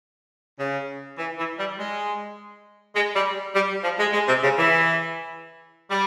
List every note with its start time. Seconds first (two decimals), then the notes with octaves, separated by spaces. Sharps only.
0.59 C#3
1.18 E3
1.38 E3
1.58 G3
1.78 G#3
2.95 G#3
3.15 G3
3.54 G3
3.84 F3
3.99 G#3
4.13 G#3
4.28 C3
4.43 C#3
4.57 E3
5.90 G3